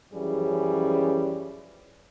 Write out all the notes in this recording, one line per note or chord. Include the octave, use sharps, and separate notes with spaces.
F#2 E3 F3 G3 C#4 G#4